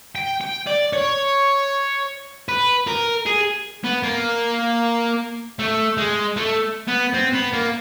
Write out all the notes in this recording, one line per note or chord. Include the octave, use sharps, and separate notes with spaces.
G5
G5
D5
C#5
B4
A#4
G#4
B3
A#3
A3
G#3
A3
B3
C4
B3
A#3